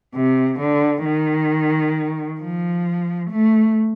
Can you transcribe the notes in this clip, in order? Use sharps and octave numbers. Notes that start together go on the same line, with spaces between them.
C3
D3
D#3
F3
A3